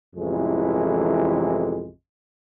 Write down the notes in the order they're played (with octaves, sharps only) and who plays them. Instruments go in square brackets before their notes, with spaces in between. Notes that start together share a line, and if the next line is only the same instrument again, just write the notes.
[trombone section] A1 F2 C3 E3 G#3